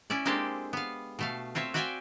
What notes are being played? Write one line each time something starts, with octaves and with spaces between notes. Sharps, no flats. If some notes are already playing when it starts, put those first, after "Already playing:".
C#4 E4 D5
G#3 A#3 C4 D4 G4 A4
B3 F5
B2 A3 F5
C4 F4 C#5 E5
F#4 D5 E5 F5 G5 G#5